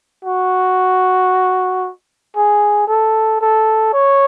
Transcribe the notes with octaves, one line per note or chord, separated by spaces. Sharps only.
F#4
G#4
A4
A4
C#5